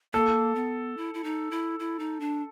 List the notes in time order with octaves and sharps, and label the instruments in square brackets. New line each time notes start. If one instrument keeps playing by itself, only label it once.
[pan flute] A#3 [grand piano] A4
[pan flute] B3
E4
E4
D#4
E4
E4
D#4
D4